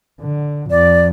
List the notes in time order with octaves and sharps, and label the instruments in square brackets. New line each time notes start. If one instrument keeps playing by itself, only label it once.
[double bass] D3
[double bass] F2 [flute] D5